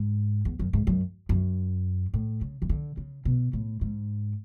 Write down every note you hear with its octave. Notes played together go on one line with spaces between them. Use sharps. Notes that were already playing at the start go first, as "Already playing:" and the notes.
Already playing: G#2
E2
F#2
G#2
F#2
F#2
A2
C#3
E3
D3
C#3
B2
A2
G#2